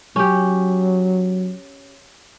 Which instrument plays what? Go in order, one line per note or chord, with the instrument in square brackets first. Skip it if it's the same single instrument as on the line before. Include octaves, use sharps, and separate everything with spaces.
[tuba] F#3 [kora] C#4 G4